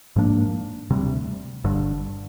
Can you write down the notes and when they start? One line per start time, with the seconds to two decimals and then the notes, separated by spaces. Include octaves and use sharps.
0.16 G#2 F3 A#3 D4
0.90 D2 C3 G3
1.64 G1 G2 D3